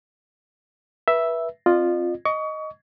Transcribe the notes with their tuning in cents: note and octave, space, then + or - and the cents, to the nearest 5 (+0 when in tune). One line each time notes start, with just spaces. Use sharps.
B4 -25 E5 +0
C4 +10 F4 +0 D#5 -40
D#5 +0 C#6 +30